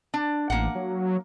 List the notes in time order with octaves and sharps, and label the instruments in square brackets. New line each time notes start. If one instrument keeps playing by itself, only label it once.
[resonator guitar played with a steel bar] D4
[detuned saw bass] A1 [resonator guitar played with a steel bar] A#3 F#5
[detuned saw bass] F#3